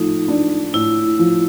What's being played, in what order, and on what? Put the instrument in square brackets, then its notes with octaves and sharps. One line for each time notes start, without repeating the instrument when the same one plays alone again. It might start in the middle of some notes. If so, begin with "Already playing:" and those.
Already playing: [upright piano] F3 A3 [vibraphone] D#4
[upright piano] D4
[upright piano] A2 [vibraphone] E4
[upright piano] F3